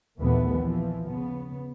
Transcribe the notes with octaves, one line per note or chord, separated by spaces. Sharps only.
A#1 D#2 A#2 E3 A3 B3
E3 F3
C#3 B3